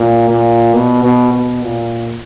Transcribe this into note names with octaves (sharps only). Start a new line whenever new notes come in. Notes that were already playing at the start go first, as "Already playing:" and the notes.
Already playing: A#2
A#2
B2
B2
B2
A#2